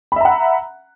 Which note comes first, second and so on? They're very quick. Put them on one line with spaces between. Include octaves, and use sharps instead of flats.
B5 E5 A#5 F#5